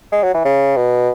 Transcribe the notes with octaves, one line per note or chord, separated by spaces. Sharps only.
G#3
F#3
E3
C#3
B2